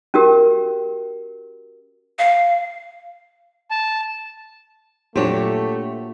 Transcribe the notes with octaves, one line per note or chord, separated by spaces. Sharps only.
C#4 F#4 G4 A#4
F5
A5
A#2 F#3 A3 D4 G4 C#5